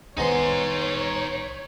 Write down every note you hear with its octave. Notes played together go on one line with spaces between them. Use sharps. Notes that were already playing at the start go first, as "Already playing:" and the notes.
C2 D#3 G#3 B3 D#4 C5 C#5 C6